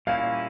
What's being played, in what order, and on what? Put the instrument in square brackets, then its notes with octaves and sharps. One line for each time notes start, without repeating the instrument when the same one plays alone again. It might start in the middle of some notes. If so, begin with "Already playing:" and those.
[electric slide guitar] A#2 G3 A#3 C#4 E4 [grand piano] F5